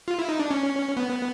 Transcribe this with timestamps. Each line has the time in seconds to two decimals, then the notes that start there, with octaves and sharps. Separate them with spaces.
0.08 F4
0.19 E4
0.29 D#4
0.39 D4
0.51 C#4
0.97 B3